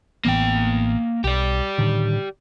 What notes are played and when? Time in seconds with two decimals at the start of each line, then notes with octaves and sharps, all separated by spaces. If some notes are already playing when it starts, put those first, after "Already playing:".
0.25 A1 E3 A#3 B3 G5
1.24 B1 G4 D5
1.78 A2 D3 D#3